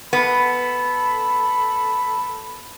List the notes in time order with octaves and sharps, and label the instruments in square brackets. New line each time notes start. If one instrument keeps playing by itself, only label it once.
[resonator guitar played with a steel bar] B3 [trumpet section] A4 B5